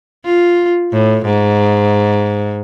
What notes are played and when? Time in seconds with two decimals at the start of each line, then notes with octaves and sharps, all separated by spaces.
0.25 F4
0.92 A2
1.25 G#2